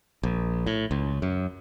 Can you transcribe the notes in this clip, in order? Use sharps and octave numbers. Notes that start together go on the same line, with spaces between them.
A#1
A2
C#2
F#2